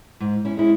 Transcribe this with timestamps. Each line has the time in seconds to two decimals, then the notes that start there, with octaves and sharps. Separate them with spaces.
0.20 G#2
0.45 C#4 E4
0.57 G#3 C#4 E4